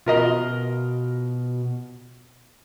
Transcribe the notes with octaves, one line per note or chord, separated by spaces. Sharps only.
B2 F4 A#4 D#5